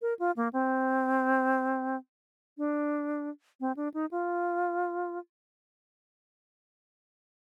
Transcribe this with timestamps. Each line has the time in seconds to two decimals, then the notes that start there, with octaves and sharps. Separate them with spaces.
0.02 A#4
0.19 F4
0.37 A#3
0.53 C4
2.58 D4
3.60 C4
3.77 D4
3.94 D#4
4.11 F4